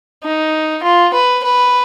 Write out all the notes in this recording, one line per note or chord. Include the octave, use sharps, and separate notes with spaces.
D#4
F4
B4
B4